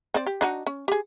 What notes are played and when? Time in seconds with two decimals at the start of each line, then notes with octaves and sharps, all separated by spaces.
0.14 C4 C5 D5
0.26 G4
0.41 D4 D#4 F#4
0.66 C#4
0.88 G4 G#4